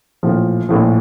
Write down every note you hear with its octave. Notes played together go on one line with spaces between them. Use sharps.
A#1 A2 F3
A#1 A2 F3